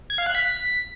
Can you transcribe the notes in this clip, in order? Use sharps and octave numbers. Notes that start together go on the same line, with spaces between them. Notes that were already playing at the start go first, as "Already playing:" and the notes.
G#6
F5
F#6
B6